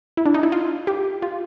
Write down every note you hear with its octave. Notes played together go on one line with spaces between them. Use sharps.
E4
D4
D#4
E4
F4
G4
F4